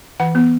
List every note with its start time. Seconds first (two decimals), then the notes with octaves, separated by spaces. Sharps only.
0.20 E3 F#5
0.35 B3